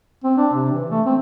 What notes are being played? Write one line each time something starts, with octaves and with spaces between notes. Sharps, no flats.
C4
D4
C3
E3
A3
C4